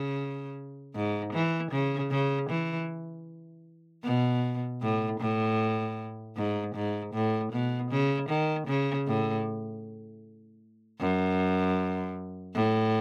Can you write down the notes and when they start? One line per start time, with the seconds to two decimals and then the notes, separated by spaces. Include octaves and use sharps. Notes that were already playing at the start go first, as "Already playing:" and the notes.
Already playing: C#3
0.95 G#2
1.33 E3
1.71 C#3
2.11 C#3
2.50 E3
4.04 B2
4.82 A2
5.20 A2
6.36 G#2
6.75 G#2
7.14 A2
7.52 B2
7.91 C#3
8.29 D#3
8.67 C#3
9.07 A2
11.00 F#2
12.55 A2